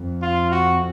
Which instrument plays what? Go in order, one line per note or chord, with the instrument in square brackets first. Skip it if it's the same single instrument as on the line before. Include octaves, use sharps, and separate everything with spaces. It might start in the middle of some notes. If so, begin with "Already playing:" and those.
Already playing: [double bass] F2
[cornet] F4
F#4